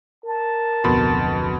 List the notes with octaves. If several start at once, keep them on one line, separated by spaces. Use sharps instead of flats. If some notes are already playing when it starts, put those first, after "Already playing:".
A#4 A5
D1 F2 B2 B5 C6